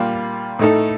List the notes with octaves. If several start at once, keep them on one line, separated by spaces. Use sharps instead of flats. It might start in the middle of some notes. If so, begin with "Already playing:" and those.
Already playing: A#2 G3 A#3 F4
A2 A3 D#4 A4